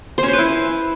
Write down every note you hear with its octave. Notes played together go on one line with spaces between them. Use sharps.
C5
C#4
C5
B4
E4